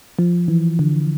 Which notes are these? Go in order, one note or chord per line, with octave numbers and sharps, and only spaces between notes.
F3
E3
D3